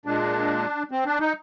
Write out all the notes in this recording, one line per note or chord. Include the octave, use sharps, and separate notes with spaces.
A#2 G#3 D4
C4
D4
D#4